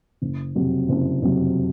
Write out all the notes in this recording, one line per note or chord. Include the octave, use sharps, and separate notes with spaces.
F#1
F2 C3 F#3
F#1
F2 C3 F#3